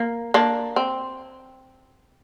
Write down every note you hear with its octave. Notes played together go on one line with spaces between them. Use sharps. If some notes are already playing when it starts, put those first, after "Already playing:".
Already playing: A#3
A#3 D4
C4